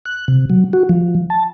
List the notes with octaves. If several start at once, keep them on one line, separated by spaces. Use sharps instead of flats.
F#6
C3
F#3
F#4
F3
A5